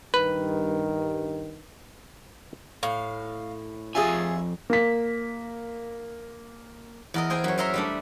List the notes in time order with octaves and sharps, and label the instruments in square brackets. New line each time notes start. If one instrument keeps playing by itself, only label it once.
[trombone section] G2 D#3 [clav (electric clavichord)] B4
[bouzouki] A2 [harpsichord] F5
[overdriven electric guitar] F2 G#5 [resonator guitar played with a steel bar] F4 G#4 [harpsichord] C#5 E5
[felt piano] A#3 B6
[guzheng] E2 A#4 D#5
G#4 C5 G5 G#5
F#2 C#5
A#4 C#5 E5 A#5 C6
G3 A3 D4